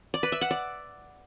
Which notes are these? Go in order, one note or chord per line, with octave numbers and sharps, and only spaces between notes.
D5
B4
E5
F#5
D5